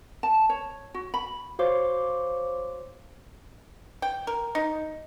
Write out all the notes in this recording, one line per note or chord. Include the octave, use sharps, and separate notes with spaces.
A5
C#5
F#4
B5
F#4 C5 C#5 F5 C6 D6
G5
A#4
D#4